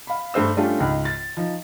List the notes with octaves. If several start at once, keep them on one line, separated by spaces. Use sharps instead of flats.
F5 B5
G2 A3 C5 E6
G3 A3 C#4 D4 F4 G4
C#2 G#2
A6
F3 D#4